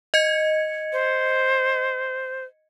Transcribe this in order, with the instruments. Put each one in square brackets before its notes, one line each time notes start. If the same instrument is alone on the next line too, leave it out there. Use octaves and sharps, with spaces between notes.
[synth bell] D#5 G#6 C#7
[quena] C5